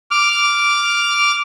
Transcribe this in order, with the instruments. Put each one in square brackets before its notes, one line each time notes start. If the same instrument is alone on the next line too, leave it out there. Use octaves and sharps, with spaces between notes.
[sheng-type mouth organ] D6 F6